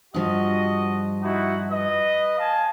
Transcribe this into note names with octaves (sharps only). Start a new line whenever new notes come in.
G2 F3 F#4 D#5
D#4 E4 F#4
B4 D#5
F5 G#5 A5